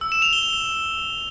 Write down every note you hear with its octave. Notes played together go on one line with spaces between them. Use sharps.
E6
E7
F7
G7
F7